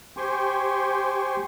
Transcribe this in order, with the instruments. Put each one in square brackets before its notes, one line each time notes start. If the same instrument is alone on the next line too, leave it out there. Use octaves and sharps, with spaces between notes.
[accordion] G4 C5 G5 G#5 C6 C#6